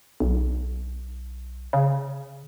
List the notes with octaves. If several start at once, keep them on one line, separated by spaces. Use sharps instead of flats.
B1
C#3